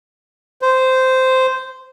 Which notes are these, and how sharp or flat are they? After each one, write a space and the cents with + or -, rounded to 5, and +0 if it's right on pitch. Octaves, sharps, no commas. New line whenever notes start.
C5 -10